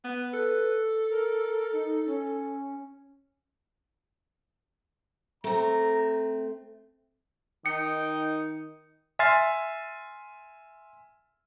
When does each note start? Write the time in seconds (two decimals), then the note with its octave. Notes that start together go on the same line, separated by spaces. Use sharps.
0.04 B3 B4
0.33 A4
1.10 A#4
1.73 D#4
2.06 C#4
5.44 A3 C4 A#5
7.66 D#3 D#4 G5 C#7
9.19 E5 G#5 C6 F6 A6 C7